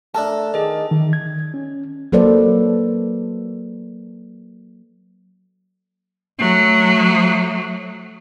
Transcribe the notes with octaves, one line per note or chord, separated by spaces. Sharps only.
A3 D4 A4 A#4 A5
D#3 G#4 D#5
D#3
G#6
C#4
F#3 A#3 A4 B4 C5 D5
F#3 A3